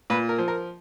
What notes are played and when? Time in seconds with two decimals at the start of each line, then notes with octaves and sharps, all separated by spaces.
0.10 A#2 B4
0.29 A#4
0.38 F3
0.48 A#4